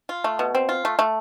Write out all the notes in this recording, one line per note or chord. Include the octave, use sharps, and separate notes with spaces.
F4
A3
B2
C4
F4
A3
A3